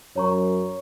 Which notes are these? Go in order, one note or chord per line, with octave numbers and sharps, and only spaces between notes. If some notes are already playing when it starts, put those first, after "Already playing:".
F#2 C#5 A#5 C#6